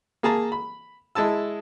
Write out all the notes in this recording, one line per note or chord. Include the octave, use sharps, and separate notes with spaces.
A#3 G#4 A5 A#5
B5
G#3 E4 A5 E6